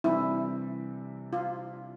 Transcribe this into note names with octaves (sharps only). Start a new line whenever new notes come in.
C3 E3 G3 D4 E4
F4